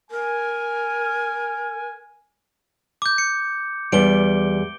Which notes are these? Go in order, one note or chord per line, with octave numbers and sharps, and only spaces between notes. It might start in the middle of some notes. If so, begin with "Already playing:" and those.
A#4 G#5
D6 G6
C#7
E2 G3 D7 G7